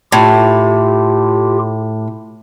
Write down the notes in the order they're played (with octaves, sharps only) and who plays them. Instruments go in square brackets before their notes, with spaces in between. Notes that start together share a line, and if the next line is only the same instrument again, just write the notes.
[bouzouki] A2 [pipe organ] F4 G4